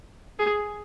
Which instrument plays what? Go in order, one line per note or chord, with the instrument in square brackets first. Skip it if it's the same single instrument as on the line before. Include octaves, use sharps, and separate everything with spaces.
[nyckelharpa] G#4